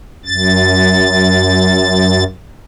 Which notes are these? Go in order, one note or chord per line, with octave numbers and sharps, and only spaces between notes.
F#2 A6